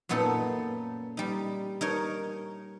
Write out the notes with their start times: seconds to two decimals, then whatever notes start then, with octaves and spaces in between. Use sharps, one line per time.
0.09 F#2 A#2 B3 D#4 A4
1.17 G3 D#4
1.81 D#4 A#4 C#5